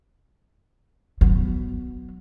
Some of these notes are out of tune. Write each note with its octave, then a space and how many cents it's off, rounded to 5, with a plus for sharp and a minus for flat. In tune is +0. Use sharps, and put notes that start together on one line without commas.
F#3 +0 B3 +0